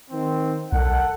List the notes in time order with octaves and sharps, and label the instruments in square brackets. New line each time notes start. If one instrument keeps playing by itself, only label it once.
[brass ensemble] D#3 C4
[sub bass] B1 [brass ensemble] A4 A#4 F#5